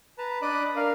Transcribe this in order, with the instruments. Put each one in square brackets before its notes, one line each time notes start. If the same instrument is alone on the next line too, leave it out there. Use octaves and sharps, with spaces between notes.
[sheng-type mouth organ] B4 A5 A#5
D4 D5 D#5 B5 D6 F#6
D4 A#4 F5